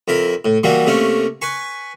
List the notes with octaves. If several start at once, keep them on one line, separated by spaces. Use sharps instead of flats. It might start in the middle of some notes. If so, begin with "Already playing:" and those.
F2 E4 A#4
A2
E3 F#3 G3 A#3
C3 A3 A#3 C#4
B4 G#5 C#6